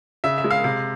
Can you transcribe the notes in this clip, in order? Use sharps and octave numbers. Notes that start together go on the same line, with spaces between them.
C#3 E5
E5
G#3
F5
C3 F5